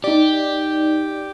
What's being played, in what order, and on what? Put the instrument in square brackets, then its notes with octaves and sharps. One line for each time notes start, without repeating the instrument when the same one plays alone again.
[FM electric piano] D#4 D5 [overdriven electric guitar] G4